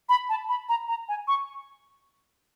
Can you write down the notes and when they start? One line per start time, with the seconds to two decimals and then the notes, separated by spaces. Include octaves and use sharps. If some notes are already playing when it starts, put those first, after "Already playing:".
0.09 B5
0.29 A5
0.49 B5
0.69 A#5
0.88 A#5
1.08 G#5
1.28 C#6